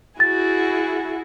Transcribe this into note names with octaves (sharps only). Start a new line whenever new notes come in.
E4 F#4 G#4 A6